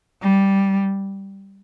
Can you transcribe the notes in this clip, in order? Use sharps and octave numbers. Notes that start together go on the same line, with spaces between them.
G3